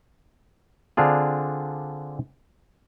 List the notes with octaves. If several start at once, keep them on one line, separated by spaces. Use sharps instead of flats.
D3 C4 D4 F4 G#4